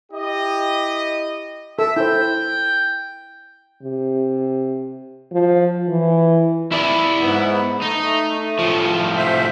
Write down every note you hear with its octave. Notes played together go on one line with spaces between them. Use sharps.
E4 G4 D#5
A4 E5
E4 C5 G5
C3
F3
E3
E4 D5
G#2 B3
A3 D#4
A2 F3
C5 E5